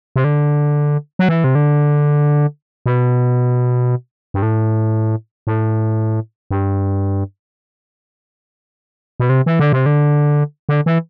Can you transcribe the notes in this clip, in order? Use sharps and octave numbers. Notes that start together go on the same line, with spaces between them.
C3
D3
F#3
E3
C3
D3
B2
G2
A2
A2
G2
B2
C3
E3
D3
C3
D3
D3
E3